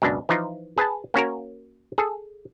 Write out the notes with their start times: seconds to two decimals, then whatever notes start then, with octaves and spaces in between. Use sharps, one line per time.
0.02 C#2 F#2 B2 D4
0.29 E3 F3 D#4 F4
0.78 G#4 B4 G#5 A5
1.14 A#3 C#4 F#4 A#4
1.98 G#4 A4